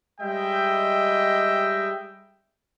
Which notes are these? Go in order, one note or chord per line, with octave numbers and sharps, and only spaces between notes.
G3 G#3 D#5 E5 G5